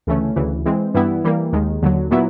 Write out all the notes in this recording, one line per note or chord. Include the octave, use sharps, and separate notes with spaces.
D2 C#3 E3 A3 C#4
D2 C#3 E3
E3 G#3 C4
G2 E3 G3 B3 E4
E3 G3 A#3
D#2 D#3 G#3
D#2 D3 F#3
A#2 F#3 B3 E4